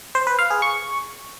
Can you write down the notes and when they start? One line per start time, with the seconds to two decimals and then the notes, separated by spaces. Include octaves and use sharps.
0.15 C5
0.27 B4
0.39 F5
0.50 G#4
0.62 C#6